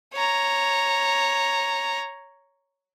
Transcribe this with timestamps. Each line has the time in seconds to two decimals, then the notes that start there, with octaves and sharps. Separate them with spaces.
0.14 C#5 A#5